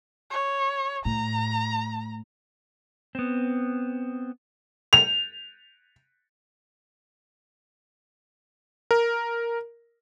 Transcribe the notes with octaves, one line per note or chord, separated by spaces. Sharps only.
C#5
A2 A#5
B3 C4
F7
A#4